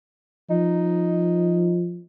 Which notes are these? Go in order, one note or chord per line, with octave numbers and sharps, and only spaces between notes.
F3 D#4